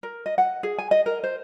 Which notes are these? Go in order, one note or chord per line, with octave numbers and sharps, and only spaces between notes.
A#4
D#5
F#5
G#4
G#5
D#5
A#4
C5